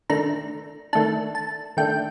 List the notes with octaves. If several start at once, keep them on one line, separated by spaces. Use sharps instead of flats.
D#3 A3 D4 A#5
D#3 A3 D4 A5
A5
D#3 A3 D4 G5